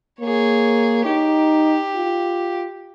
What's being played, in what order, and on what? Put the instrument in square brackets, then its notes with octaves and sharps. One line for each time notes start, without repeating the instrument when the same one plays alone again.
[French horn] A#3 [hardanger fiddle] G#4 C#5
[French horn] D#4 [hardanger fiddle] G4
[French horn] F4